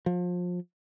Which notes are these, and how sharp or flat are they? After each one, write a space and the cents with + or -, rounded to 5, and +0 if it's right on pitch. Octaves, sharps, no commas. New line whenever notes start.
F3 +30